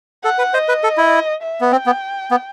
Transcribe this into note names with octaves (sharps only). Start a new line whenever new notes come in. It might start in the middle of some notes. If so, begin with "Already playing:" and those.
A4 F#5
B4
C5 D#5
B4
A4
E4
E5
B3
C4 G5
B3
B3